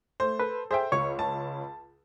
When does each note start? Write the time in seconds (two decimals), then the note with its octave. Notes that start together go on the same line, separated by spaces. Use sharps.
0.20 A3 C5
0.40 A4 B4
0.71 G#4 C5 E5 G5
0.92 C#2 C#5 C#6
1.19 A5